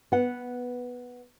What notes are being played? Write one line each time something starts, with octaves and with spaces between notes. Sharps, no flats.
B3 F#5